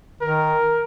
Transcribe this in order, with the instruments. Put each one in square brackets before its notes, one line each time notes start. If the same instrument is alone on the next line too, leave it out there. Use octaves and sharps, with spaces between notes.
[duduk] D#3 [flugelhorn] A#4